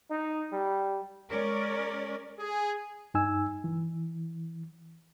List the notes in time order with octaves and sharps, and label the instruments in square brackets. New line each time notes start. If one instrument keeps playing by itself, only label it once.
[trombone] D#4
G3
[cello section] G#3 C#4 A#4 D5
[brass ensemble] G#4
[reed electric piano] G2 D#4 G#5 E6
E3